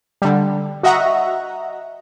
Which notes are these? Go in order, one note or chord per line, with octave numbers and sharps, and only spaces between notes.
D3 G3
F#4 D#5 E5 F#5 A#5